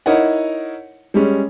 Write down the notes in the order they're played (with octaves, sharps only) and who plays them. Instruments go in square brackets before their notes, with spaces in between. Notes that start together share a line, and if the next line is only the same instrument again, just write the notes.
[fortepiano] D#4 E4 A#4 C#5 D#5 F#5
G3 G#3 C#4